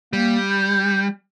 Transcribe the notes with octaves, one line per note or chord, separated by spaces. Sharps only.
G3 A#3
G6